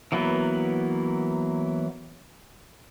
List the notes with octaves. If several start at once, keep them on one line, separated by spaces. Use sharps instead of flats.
E3 F#3 A#3 B3